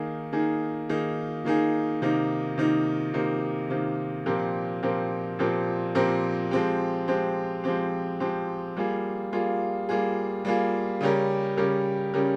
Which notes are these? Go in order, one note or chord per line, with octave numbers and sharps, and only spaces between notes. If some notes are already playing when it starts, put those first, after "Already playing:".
Already playing: D#3 A#3 D#4 G#4
D#3 A#3 D#4 G#4
D#3 A#3 D#4 G#4
D#3 A#3 D#4 G#4
C3 D#3 A#3 D#4
C3 D#3 A#3 D#4
C3 D#3 A#3 D#4
C3 D#3 A#3 D#4
A#2 F3 C4 G4 A#4
A#2 F3 C4 G4 A#4
A#2 F3 C4 G4 A#4
A#2 F3 C4 G4 A#4
F3 G#3 C4 G4
F3 G#3 C4 G4
F3 G#3 C4 G4
F3 G#3 C4 G4
G3 A#3 F4 G#4
G3 A#3 F4 G#4
G3 A#3 F4 G#4
G3 A#3 F4 G#4
C#3 G3 C#4 G4 A#4
C#3 G3 C#4 G4 A#4
C#3 G3 C#4 G4 A#4